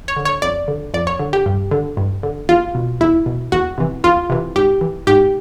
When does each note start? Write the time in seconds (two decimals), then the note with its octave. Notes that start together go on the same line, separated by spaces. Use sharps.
0.08 C#5
0.16 D3
0.25 C#5
0.42 F2 D5
0.68 D3
0.94 F2 D5
1.07 C#5
1.19 D3
1.33 G4
1.46 G2
1.71 D3
1.97 G2
2.23 D3
2.49 E2 F4
2.75 B2
3.01 E2 E4
3.26 B2
3.52 E2 F#4
3.78 C3 E3
4.04 E2 F4
4.30 C3 E3
4.56 G#2 G4
4.81 E3
5.07 G#2 G4